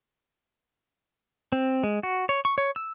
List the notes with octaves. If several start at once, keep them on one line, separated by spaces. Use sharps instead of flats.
C4
G#3
F#4
C#5
C#6
C#5
E6